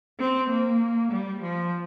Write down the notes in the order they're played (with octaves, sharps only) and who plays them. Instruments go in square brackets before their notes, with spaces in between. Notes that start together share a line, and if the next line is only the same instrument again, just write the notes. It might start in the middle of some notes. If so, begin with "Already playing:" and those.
[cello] C4
A#3
G3
F3